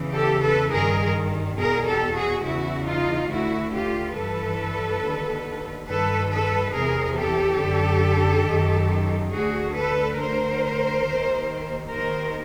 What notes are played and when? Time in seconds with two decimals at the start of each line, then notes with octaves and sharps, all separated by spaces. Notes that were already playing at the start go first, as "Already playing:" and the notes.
Already playing: E2 C#3 E3
0.14 G4 A4
0.42 A4 B4
0.71 G2 D#3 G#4 A#4
1.57 E2 B2 G#4 A#4
1.86 G4 A4
2.15 F#4 G#4
2.43 E2 C#3 E3 E4 F#4
2.86 D#4 F4
3.30 D2 D3 E4 F#4
3.73 F4 G4
4.15 G2 E3 A4 B4
5.01 D#2
5.07 D3
5.88 G2 D#3 A4 B4
6.31 A4 B4
6.75 E2 C3 E3 G#4 A#4
7.17 G4 A4
7.60 F#2 D3
8.46 F#2 D#3
9.32 D2 D3 F#4 G#4
9.75 A4 B4
10.19 D2 D3 A#4 C5
11.05 D#2 D#3
11.91 D#2 D#3 A#4 C5